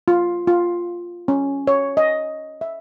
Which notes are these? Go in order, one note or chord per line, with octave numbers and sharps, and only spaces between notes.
F4
F4
C#4
C#5
D#5
E5